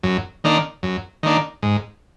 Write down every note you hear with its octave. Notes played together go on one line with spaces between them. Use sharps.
F#2
D#3 A#3 D4
F#2
D#3 A#3 D4
G#2